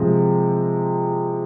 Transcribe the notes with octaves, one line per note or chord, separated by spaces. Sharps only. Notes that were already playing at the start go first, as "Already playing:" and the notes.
Already playing: C3 F3 G#3